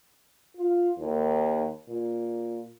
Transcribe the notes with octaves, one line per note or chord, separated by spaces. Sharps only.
F4
D#2
A#2